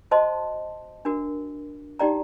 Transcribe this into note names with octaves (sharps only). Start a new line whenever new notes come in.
F#4 C5 D#5 A5 C6
D4 F#4 A#4
D#4 G4 D5 G5 A#5